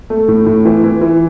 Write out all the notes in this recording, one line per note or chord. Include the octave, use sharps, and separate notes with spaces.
A3
A2
A2
E3
E3
E3